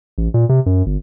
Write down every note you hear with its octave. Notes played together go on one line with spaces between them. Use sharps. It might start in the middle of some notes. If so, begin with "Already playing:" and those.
A1
A#2
C3
F#2
G1